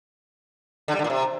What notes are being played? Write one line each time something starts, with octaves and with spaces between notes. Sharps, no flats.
D3
G3
D3
A#2
C3